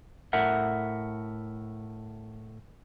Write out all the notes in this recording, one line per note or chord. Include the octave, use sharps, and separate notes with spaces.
A2 A#4 E5 F#5